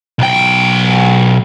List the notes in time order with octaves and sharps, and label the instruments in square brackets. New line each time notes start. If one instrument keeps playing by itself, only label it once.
[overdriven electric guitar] B1 G5